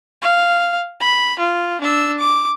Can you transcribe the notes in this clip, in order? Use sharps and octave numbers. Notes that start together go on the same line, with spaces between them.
F5
B5
F4
D4 E6
D6